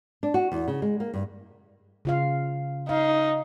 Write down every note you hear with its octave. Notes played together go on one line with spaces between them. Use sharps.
D4
F#4
E2
C#3
G#3
A#3
G2
C#3 F4 F5
D#4 F5